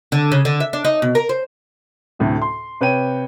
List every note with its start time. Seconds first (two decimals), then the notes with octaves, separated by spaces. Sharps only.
0.12 D3
0.32 C#3
0.45 D3
0.60 E5
0.73 D4
0.85 D#4
1.02 B2
1.15 A#4
1.29 C5
2.19 D2 A2 C3
2.42 C6
2.81 C3 B4 C#5 G5 D#7